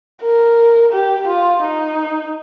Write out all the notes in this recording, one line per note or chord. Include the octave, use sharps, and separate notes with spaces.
A#4
G4
F4
D#4